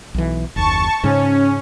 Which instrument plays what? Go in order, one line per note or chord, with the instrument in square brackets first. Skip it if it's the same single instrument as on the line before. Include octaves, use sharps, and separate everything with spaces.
[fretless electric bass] B1 E3
[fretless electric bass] F#1 D#2 [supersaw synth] A5 C#6
[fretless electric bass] G#2 C#3 G#3 [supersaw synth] C#4